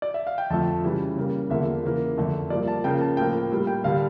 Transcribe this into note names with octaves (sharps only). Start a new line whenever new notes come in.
D5
E5
F5
G5
F2 D3 F3 A3 A5
C#3 E3 G3
C#3 G3 A#3
E2 D3 F3 A#3 E5
C#3 E3 A#3
F2 D3 A3
G2 F3 A#3 D5
A5
C#3 F3 A#3 G5
A5
A2 F3 A#3 G5
A2 G3 A#3
G5
G2 D3 G3 F5